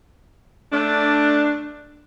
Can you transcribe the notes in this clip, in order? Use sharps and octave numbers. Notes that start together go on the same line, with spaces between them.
A3 D4